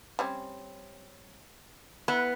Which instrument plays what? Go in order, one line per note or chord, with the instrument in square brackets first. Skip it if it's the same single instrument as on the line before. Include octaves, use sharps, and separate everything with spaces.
[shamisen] G3 C4 C#4
[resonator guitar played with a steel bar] B3 [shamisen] E4